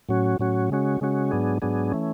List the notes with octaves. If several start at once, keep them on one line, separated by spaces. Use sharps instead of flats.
A2 F#3 C#4 F#4
A2 F#3 C#4 F#4
C#3 G#3 C#4 F#4
C#3 G#3 C#4 F#4
G#2 F#3 B3 D4 G#4
G#2 F#3 B3 D4 G#4
E3 A3 C#4